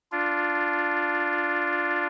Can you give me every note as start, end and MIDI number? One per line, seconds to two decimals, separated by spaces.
0.12 2.07 62
0.12 2.07 65